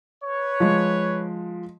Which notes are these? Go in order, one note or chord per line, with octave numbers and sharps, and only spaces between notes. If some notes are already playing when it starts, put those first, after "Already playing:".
B4 C#5
F3 G#3